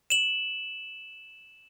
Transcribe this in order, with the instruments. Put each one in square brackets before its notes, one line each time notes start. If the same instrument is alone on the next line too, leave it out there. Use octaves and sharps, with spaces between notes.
[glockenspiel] E7 F#7